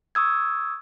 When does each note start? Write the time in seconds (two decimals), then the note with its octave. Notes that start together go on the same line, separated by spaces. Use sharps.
0.15 C#6 D#6 E6 G#6